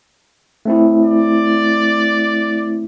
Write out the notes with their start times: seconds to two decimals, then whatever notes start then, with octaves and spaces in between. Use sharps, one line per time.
0.65 A3 C4 E4
1.04 D5